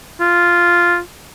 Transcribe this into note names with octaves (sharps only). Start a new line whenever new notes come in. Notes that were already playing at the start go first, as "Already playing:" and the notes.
F4